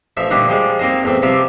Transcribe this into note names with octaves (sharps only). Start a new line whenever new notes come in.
A1 F3 E5
A#2 D3 G3 A3 D4 D#4
F3 G3 G#3 D5
A#3 C4 D#4 C5 D#5
E2 A2 C4
C3 F3 G3 C4